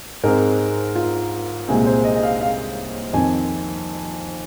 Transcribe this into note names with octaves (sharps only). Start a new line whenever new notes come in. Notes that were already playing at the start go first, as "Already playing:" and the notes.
G#2 G#3 C4 A#4
F4
C2 A#2 G#3 C4 G#4
C5
D#5
D#5
F5
F5
F2 D#3 C4 G#5